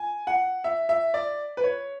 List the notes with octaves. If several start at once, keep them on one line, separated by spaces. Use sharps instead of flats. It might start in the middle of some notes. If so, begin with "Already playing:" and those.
Already playing: G#5
F#5
E5
E5
D5
B4
C#5